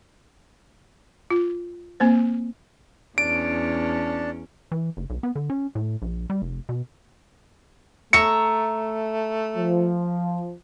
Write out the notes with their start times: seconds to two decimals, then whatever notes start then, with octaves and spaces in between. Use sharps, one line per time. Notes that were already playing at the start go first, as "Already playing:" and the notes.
1.30 F4
2.00 A#3 C4 C5
3.18 E2 C#4 D4 A5 D7
4.72 E3
4.97 F#1
5.10 B1
5.23 B3
5.35 D3
5.50 C#4
5.75 A2
6.02 A#1
6.30 G3
6.42 F1
6.69 B2
8.13 A3 C#5 E5 A#5 C#7
9.56 F3